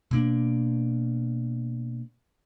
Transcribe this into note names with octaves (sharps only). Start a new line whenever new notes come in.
B2 A#3 D4